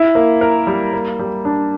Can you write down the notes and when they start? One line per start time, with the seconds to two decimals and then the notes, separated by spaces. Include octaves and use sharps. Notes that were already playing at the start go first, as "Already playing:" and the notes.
Already playing: E4
0.15 A#3
0.41 A#4
0.67 G3
0.93 A#3
1.19 G3
1.45 D4